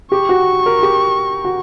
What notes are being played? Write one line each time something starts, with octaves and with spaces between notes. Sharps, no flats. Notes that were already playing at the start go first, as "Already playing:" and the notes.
G4 C#6
F#4
A#4
G4
F#4